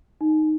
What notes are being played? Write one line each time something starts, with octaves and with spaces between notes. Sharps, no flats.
D#4